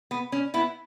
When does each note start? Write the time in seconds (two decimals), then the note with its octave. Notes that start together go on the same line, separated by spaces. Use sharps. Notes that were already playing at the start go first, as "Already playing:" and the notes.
0.11 B3
0.32 C#4
0.54 B3 E4